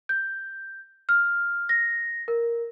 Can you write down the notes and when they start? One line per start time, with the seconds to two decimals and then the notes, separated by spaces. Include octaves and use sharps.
0.09 G6
1.09 F6
1.69 A#6
2.28 A#4